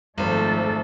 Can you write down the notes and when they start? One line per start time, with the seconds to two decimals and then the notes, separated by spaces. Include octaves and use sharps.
0.18 G#1 F3 A3 A4 C5